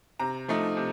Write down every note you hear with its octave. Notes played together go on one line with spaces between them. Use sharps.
C3 A#5
F3 A3 D#4
C3